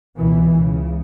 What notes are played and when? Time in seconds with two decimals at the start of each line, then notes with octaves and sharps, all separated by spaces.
0.17 C#2 B2 E3
0.54 C#2 C#3